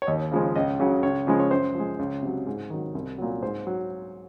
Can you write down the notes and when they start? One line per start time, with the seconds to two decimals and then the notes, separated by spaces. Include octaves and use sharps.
0.02 C#5
0.07 D#2 D#5
0.32 C#3 F3 G#3
0.56 C#2 D#5
0.80 C#3 F#3
1.03 C#2 C#5
1.27 C#3 F3 G#3
1.40 C#5
1.51 F#2 C5
1.75 F3 G#3
1.99 C#2
2.23 C3 F#3
2.47 G#2
2.70 D#3 F#3
2.95 C2
3.18 A#2 F#3
3.42 G#2 C5
3.67 F#3